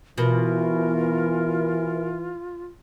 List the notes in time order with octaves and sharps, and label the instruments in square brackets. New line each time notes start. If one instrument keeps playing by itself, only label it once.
[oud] B2 [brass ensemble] E3 [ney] F4 [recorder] A#4